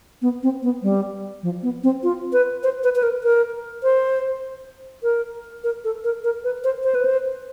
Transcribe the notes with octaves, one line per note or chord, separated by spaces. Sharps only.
B3
C4
B3
G3
F3
B3
C4
F4
B4
C5
B4
B4
A#4
A#4
C5
A#4
A#4
A4
A#4
A#4
B4
C5
C5
B4
C5